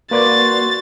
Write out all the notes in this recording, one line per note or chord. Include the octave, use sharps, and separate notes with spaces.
A#3 F#4 B4 D5 C6 A6